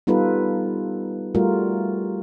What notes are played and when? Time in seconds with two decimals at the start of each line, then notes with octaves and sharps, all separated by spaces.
0.07 G3 B3 D#4 F4 A4 B4
1.35 G3 A3 F4 F#4 A#4